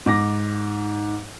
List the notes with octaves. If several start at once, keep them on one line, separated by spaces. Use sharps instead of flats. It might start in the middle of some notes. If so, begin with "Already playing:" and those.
G#2 D6 A#6